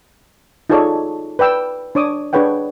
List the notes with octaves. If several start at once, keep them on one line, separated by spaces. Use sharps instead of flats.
D#4 F4 G#4 A4 C#5 D5
B4 D5 G5 E6
D4 C#5 D6 D#6
D4 G#4 B4 C#5 F#5 G5